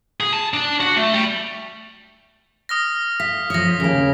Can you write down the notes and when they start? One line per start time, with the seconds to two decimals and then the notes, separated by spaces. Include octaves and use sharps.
0.20 G#4
0.33 A5
0.54 D4
0.80 F#4
0.97 A3
1.14 G3
2.69 D#6 F6 A#6
3.20 F5 B6
3.50 F3 C#5 D#6 A#6
3.80 D#2 C#3 A#3